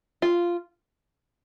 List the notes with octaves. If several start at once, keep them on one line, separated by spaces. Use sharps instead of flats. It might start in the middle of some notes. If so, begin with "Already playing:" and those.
F4